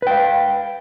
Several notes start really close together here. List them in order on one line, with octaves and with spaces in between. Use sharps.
B4 G5 F5